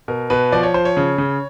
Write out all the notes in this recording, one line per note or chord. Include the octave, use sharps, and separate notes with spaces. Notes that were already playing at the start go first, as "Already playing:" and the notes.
B2 A#4
B2 B4
F3 D5
C#5
F3 C5
C#5
C#3
C#3